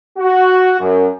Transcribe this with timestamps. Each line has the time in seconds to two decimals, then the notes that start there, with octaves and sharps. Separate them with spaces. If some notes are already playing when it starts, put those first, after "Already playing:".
0.18 F#4
0.79 F#2